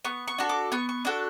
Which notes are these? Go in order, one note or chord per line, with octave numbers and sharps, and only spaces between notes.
B3 C#6
C#6
D4 F#4 A4
D6
B3 C#6
C#6
D4 F#4 A4 D6